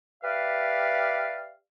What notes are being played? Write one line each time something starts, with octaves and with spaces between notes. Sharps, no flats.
G4 B4 D5 E5 F5